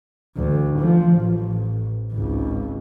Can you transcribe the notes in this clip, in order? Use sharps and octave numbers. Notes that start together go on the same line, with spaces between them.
D2
F3
A1
G#1 C#2